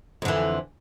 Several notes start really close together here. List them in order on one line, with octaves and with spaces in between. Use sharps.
F2 D3 E3